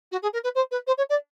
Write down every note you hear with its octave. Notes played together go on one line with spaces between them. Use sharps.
F#4
G#4
A#4
B4
C5
B4
C5
C#5
D5